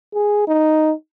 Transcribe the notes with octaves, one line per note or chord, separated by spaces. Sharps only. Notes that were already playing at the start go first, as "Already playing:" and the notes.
G#4
D#4